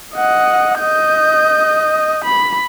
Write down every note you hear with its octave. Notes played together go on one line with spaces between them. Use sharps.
D#5 F#5
D#5 G6
B5